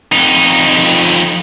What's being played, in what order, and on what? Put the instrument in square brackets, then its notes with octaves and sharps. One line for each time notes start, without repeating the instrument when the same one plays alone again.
[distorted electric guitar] F2 D#4